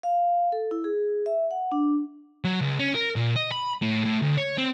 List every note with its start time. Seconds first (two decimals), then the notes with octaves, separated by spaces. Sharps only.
0.03 F5
0.52 A4
0.71 E4
0.84 G#4
1.26 E5
1.51 F#5
1.72 D4
2.44 F#3
2.61 C#2
2.79 C#4
2.95 A#4
3.16 A#2
3.36 D#5
3.51 B5
3.82 A2
4.05 A2
4.21 D2
4.37 C#5
4.58 C4